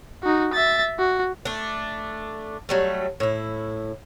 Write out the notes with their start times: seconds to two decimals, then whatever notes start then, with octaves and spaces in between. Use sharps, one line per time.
0.23 D#4 F#4
0.53 E5 A6
0.99 F#4
1.45 A3 D4
2.69 F#3 G3 A3
3.20 A2 E4